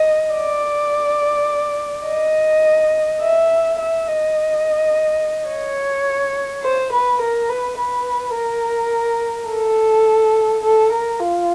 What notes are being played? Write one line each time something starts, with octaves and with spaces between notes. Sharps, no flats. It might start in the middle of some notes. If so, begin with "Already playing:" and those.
Already playing: D#5
D5
D#5
E5
E5
D#5
C#5
C5
B4
A#4
B4
B4
A#4
A4
A4
A#4
F4